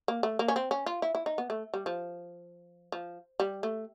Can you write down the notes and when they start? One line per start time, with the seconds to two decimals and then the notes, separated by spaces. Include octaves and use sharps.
0.08 A#3
0.23 A3
0.39 A#3
0.48 C#4
0.56 C4
0.71 C#4
0.86 F4
1.02 E4
1.15 E4
1.26 D#4
1.38 B3
1.50 A3
1.74 G3
1.86 F3
2.92 F3
3.40 G3
3.63 A3